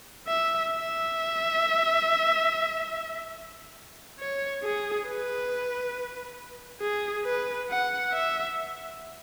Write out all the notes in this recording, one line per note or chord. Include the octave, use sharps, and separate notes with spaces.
E5
E5
C#5
G#4
B4
G#4
B4
F#5
E5